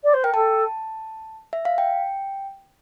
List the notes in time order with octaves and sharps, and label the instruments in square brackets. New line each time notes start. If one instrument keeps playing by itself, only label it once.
[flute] D5
C5
[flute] A#4 [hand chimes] G5
[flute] A4 [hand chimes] A5
[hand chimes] E5
F5
G5